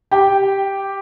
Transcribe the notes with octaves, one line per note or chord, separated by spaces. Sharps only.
G4 G5